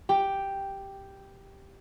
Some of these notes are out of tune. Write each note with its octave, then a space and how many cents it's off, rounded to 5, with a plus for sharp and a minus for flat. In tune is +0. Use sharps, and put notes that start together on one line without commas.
G4 +0 G5 +0